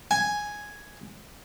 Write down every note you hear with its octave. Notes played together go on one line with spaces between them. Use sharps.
G#5